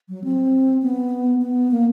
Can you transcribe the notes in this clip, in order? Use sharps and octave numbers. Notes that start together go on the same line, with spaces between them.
F#3
C4
B3
B3
A#3